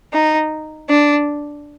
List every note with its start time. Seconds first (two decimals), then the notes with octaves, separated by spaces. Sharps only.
0.13 D#4
0.90 D4